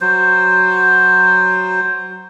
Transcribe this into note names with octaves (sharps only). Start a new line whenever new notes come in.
F#3 C5